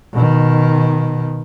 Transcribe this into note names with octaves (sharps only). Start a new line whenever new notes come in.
B2 D#3